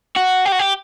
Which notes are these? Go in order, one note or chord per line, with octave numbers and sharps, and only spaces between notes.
F#4
G4
F#4
G4